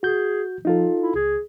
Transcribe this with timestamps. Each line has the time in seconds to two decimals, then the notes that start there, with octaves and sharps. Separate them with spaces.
0.03 F#4 G#4 G6
0.65 F3 D#4 F4 A4
1.02 E4
1.15 C#2 G#4